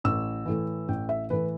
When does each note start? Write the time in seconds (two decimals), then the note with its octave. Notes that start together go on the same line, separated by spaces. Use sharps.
0.04 A1 E6
0.46 A2 E3
0.88 A1 G5
1.09 E5
1.30 A2 E3 B4